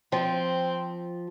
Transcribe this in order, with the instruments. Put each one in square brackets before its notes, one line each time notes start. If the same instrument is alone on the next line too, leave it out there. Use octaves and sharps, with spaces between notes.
[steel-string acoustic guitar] F3 [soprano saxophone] C4